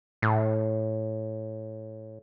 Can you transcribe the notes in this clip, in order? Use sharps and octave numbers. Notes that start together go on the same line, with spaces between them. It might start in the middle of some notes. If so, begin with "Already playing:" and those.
A2